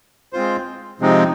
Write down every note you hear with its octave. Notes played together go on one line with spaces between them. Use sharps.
G#3 C4 F4 C5
C3 F3 G#3 C4 D#4